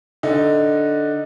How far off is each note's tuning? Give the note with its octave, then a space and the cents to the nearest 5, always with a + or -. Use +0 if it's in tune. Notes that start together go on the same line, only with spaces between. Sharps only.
D3 +0 D#4 +0